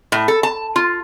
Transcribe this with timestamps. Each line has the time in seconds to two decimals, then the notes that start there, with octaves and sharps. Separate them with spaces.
0.12 A2
0.28 A4
0.43 A5
0.76 F4